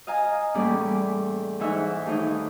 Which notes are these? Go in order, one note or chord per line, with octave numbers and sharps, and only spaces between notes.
D#5 F5 G#5 A#5
E2 A2 G3 A#3 C#4 D5
G#2 E3 D#4 C#5 E5 F#5
D#2 A3 D#4 D#5